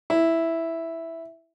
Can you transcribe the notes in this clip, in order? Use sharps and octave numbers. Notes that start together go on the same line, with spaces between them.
E4